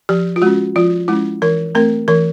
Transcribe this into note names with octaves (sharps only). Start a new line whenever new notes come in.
F3 G4
F4
G#3 C#4 F#4
F3 F4
G#3 C#4 E4
E3 A#4
A3 C4 A#4
E3 A#4